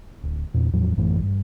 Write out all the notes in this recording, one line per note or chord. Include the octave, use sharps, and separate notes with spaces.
D1
E2 A#2
E2 A2 F3 F#3
A1 F#2 E3 A3
G2